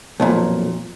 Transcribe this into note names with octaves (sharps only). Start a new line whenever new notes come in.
B1 F2 A#2